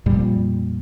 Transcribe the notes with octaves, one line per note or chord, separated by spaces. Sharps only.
F2 A#2 G3